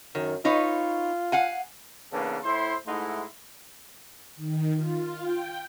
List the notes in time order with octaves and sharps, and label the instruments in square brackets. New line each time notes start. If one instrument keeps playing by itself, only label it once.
[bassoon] F#2 [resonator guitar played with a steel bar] D#3
[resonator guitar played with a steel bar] D#4 B4 C#5 [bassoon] F4
[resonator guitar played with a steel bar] F5 F#5 G#5
[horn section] C#3 E3 A#3 B3 D4 A4
A2 E4 C5 C6
G#2 A3 D#4 E4 F#5 C6
[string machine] D#3
F4
G5